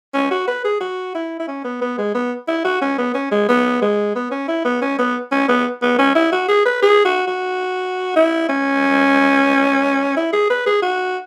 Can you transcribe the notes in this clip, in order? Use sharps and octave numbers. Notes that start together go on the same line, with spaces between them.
C#4
F#4
B4
G#4
F#4
E4
E4
C#4
B3
B3
G#3
B3
E4
F#4
C#4
B3
C#4
G#3
B3
G#3
B3
C#4
E4
B3
C#4
B3
C#4
B3
B3
C#4
E4
F#4
G#4
B4
G#4
F#4
F#4
E4
C#4
E4
G#4
B4
G#4
F#4